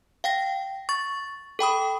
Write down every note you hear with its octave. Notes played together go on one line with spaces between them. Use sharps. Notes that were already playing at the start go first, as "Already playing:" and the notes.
F5 G5 A#6
C#6 A6
A4 G5 B5 D#6